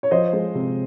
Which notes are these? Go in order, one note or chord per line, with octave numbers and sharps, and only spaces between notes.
C#5
F3 C5 D#5
G#3
C3